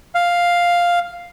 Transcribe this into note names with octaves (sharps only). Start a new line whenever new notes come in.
F5